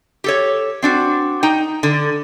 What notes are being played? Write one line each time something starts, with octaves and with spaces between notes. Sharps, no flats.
G4 A4 C#5
C4 D4 F#4
D#4 G5
D3